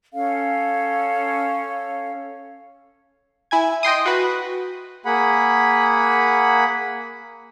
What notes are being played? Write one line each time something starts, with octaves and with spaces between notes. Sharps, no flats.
C#4 A4 C#5 F5
E4 G#5 G#6
D#5 G5 C6 D#6
F#4 B4
A#3 G#4 F#5 B5